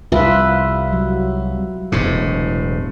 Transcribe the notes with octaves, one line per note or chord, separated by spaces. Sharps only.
C2 F4 B4 E5
F#3
E1 A2 C3